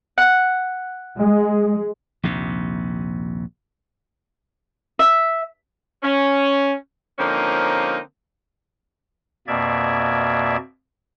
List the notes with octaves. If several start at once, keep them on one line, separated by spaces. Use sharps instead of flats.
F#5
G#3
A#1 D#2 C3
E5
C#4
D3 F3 A#3 C4 C#4 D#4
F2 B2 A#3 D5 E5 G#6